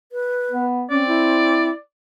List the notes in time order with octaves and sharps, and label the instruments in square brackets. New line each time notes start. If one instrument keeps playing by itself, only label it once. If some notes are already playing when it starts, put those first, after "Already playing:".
[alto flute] B4
[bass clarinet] B3
[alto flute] C4 [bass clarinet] C#4 [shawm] D5
[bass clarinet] E4